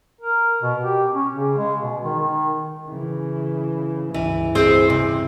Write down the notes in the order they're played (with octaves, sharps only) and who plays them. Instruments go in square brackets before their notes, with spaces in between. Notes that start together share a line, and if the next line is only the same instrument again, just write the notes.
[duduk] A#4
B2
G4
C#4
C#3
G#3
B2
D#3
D#3
[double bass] C#3 E3
[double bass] G1 C#2 [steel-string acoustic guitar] E3
[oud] C4 G#4 C5
C3